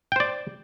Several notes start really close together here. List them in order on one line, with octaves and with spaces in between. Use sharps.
G5 C5 D5